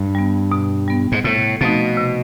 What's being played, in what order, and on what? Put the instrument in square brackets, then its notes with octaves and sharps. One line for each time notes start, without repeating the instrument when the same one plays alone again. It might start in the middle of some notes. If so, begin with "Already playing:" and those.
Already playing: [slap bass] G2
[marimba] G3 B3
B2
G3 B3
[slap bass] G#2
[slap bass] A2 [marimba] C3
[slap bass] B2 [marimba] F3 A3 C4 D#4
[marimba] C3